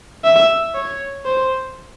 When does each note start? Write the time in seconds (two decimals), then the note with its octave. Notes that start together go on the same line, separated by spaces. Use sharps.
0.24 E5
0.75 C#5
1.25 C5